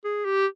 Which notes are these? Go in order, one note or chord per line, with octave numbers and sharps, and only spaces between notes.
G#4
G4